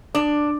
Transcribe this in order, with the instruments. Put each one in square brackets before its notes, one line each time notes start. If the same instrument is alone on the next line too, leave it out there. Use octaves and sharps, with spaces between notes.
[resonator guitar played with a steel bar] D4